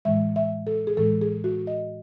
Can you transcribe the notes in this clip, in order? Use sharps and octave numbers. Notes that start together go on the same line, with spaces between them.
A2 E3 G#3 E5
E5
A4
G#4
A2 E3 G#3 A4
G#4
F#4
D#5